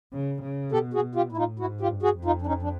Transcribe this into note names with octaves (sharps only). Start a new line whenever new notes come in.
C#3
C#3
B2 G4 A4
F#4 G#4
B2
F4 G4
A2 E4
D#4 F4
G#2 E4 F#4
F4 G4
G2
F#4 G#4
F2
D#4 F4
D4
C#4 D#4
D4